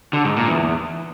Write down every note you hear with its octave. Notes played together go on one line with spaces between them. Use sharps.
D3
G#2
A#2
E2